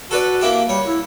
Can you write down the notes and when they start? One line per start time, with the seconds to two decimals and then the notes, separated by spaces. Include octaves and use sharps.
0.11 F#4 A4 B4 D5
0.41 A#3 E4 G4
0.69 G3 C#5
0.86 E4